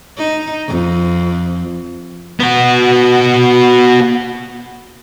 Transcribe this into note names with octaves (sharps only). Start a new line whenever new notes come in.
D#4
F2
B3 F#4